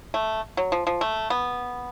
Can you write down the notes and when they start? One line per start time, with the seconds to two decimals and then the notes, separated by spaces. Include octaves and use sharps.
0.14 A3
0.57 F#3
0.72 F3
0.87 F3
1.01 A3
1.30 B3